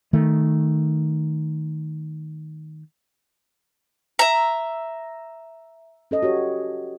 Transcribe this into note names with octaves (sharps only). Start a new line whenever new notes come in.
D#3 A3
E5 A#5
C#4 A4 D#5
F#4 G4 C#5